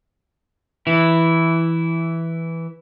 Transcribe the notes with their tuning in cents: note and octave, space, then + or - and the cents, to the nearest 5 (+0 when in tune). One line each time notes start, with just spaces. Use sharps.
E3 +0 E4 +0